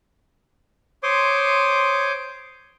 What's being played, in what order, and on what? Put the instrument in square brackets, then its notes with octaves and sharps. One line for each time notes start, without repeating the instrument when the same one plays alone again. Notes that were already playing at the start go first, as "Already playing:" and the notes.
[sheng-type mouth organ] C5 C#5 C6 D6 D#6